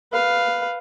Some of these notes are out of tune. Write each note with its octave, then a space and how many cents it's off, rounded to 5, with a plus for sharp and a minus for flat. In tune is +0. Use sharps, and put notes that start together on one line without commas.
B4 +0 F5 +0